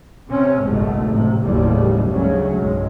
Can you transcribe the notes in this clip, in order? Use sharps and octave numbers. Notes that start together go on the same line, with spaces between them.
C3 C4 C#4
F#1 B1 G#2 B2 A3
A1 C3
F#1 D#2 A2 C#3 F3 G3
D2 G#2 C#3 F#3 A3 C#4
B1 G2 G#3